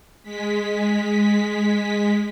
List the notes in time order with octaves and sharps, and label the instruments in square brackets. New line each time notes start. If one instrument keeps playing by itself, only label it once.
[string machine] G#3 B6